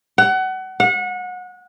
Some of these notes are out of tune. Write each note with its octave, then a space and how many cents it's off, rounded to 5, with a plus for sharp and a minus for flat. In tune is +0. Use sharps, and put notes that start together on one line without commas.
F#5 +25
F#5 -30